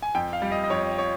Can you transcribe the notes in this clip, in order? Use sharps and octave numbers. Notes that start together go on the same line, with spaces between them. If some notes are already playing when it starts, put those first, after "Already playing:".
G#5
F2 G5
F5
G3
D#5
D#5
F2 C#5
C#5